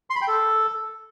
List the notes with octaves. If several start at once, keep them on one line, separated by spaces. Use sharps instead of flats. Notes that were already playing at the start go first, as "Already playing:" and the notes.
C6
B5
G5
A4